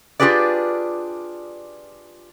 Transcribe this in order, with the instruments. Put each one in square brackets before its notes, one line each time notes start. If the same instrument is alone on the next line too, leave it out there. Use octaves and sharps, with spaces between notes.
[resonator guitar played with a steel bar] D4 F4 G4 G#4 B4 D5